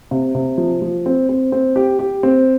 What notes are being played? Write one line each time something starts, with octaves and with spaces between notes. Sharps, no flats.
C3
C3
F3
F3
C4
C4
C4
G4
G4
C4